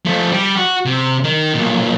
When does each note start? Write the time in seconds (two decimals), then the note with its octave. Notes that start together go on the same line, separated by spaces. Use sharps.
0.06 F3 A3
0.32 G3 G4
0.57 F#4
0.86 C3
1.24 D#3
1.54 B1 A#2